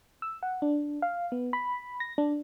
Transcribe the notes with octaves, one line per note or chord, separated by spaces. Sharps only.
E6
F#5
D4
F5
B3
B5
A#6
D4